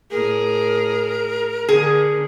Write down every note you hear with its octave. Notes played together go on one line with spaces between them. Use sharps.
A2 G#4 A#4
D3 G#4